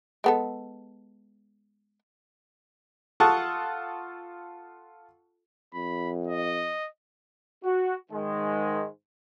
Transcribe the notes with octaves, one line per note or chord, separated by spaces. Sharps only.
G#3 B3 A4
F4 A4 F#5 A5 C#6 D#6
F2 B5
D#5
F#4
G#2 D#3 G#3